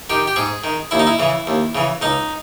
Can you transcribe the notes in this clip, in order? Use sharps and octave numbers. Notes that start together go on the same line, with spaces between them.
D#3 G4
G4
G#2 G#4
D#3
D#2 E4
D#4
E4
C#3 E3
D#2
C#3 E3
C#2 D#4